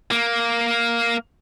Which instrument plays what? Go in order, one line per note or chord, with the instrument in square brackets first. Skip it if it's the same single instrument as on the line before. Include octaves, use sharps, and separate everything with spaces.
[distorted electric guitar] A#3